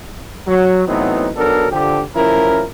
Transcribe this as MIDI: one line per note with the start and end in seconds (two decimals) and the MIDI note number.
0.48 0.83 54
0.88 1.30 45
0.88 1.30 52
0.88 1.30 54
0.88 1.30 59
0.88 1.30 60
0.88 1.30 63
1.37 1.68 35
1.37 1.68 54
1.37 1.68 59
1.37 1.68 62
1.37 1.68 69
1.37 1.68 70
1.71 2.02 50
1.71 2.02 53
1.71 2.02 67
2.16 2.64 33
2.16 2.64 53
2.16 2.64 61
2.16 2.64 64
2.16 2.64 70